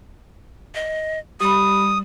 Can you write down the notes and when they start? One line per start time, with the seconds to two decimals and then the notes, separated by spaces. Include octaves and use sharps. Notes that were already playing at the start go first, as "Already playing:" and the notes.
0.75 D#5
1.40 G3 G4 B5 D#6